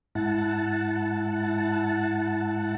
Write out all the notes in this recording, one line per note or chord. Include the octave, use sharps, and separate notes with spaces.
G#2 E4 F#5 A5